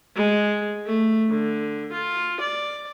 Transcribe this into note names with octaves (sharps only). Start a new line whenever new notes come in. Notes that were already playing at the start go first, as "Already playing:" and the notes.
G#3
A3
D3
F4
D5